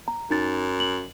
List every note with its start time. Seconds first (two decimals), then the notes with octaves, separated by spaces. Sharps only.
0.08 A#5
0.30 F#2 D#4 A6
0.80 F#7